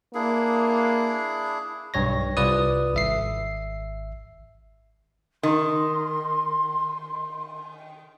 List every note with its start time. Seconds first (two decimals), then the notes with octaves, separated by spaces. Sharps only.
0.14 A#3 D4 E4 G#4
1.94 B1 G2 C#5 A#6
2.37 C2 F4 B4 D5 D#6
2.94 G#1 E5 C7
5.43 D#3 C6